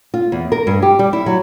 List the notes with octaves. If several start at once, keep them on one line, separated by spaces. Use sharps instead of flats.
F4
E2
A#4
G2
G4
G3
E4
F#3